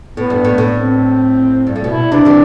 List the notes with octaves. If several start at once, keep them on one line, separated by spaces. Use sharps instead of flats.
A2 B3
G2
A2
A2
C4
G2
A2
B2 E4
C3 E3 D4
E3 G3